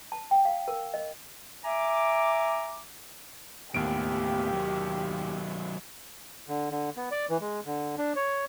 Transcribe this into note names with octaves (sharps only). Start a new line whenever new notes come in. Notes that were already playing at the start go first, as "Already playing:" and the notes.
A5
G5
F5
A#4
D#5
E5 G#5 A#5 D6
D#2 A2 B3 G4 D7
D#3 F#3
D3
D3
B3
D5
E3
G#3
D3
D4
C#5